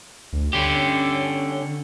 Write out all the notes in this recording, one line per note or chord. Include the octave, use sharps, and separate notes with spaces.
D2
D3 C#4 G4